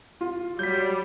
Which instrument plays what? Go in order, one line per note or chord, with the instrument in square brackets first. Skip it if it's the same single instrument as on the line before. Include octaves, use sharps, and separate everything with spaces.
[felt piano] F4
[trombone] F#3 [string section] G3 [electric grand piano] G6 B6